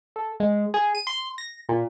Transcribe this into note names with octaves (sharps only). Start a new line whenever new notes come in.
A4
G#3
G#4
D#7
C6
A#6
A#2